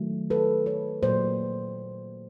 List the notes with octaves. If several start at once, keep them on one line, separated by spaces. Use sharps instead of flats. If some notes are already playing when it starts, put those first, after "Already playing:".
Already playing: D#3 F#3 A3
A4 B4
B4 C#5
A#2 F#3 A#3 C5 D5